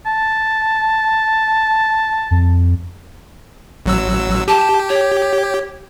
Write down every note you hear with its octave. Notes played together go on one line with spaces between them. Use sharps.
A5
F2
A1 F#3 E6
G4 A5
C#5